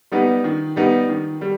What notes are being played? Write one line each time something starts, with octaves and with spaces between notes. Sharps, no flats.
G3 B3 D#4
D#3
G3 B3 D#4
D#3
G3